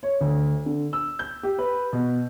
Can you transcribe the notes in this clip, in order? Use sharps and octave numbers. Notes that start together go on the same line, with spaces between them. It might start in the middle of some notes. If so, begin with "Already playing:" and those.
C#5
D2
D3
E6
G6
G4
B4
B2